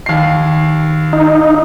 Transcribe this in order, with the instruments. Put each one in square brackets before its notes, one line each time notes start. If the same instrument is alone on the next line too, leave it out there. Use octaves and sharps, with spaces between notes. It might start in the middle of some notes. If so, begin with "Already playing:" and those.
[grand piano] D#2 C7
[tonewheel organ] D#4